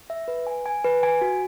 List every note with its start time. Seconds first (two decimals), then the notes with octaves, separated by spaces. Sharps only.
0.10 E5
0.28 B4
0.47 G#5
0.66 G#5
0.84 B4
1.03 G#5
1.21 F#4